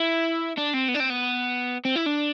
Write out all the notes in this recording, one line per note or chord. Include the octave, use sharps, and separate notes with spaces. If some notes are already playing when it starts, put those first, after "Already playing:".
Already playing: E4
D4
C4
B3
D4
C4
B3
C4
E4
D4